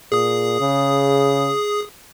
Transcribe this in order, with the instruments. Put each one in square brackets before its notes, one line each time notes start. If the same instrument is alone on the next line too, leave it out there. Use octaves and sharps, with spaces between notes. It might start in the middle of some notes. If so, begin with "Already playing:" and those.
[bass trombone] A#2 [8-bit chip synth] G#4 D#6
[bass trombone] C#3